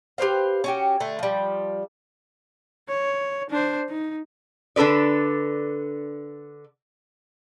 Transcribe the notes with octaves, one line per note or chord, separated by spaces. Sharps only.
G4 B4 C5 F5
C#4 F#4 G4
D3 A3
F3 G3
C#5
D4 C5
D#4
D3 D4 A4 B4 D5